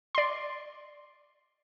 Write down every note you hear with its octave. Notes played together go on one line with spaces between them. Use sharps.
D5 C6